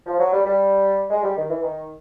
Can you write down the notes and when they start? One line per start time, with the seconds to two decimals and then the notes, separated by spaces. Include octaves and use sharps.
0.06 F3
0.20 F#3
0.33 G3
0.45 G3
1.10 G#3
1.23 G3
1.37 D#3
1.50 E3
1.63 D#3